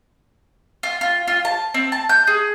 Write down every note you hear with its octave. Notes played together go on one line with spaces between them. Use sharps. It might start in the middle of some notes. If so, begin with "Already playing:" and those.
F4
F4
F4
A5
C4
A5
G6
G#4